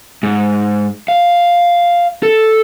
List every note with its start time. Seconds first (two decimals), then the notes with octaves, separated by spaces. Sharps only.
0.23 G#2
1.08 F5
2.23 A4